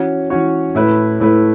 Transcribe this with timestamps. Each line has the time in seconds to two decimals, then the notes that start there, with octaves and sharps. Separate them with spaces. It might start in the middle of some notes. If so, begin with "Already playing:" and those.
Already playing: E3 C#4 F#4 C#5
0.30 E3 C#4 F#4 C#5
0.75 A2 A3 E4 B4
1.20 A2 A3 E4 B4